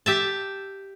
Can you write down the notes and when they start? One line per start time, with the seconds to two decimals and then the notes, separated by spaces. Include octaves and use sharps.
0.06 G4 E5 A5